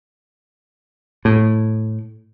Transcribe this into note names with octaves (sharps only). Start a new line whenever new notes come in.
A2